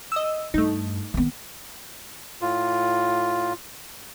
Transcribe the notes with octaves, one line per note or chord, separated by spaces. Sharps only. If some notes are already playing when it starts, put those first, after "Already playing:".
D#5 E6
G2 A3 D#4
D#3 B3
A2 F4